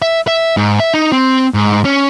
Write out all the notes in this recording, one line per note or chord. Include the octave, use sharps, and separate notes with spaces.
E5
E5
G#2
E5
D#4
C4
G#2
C#4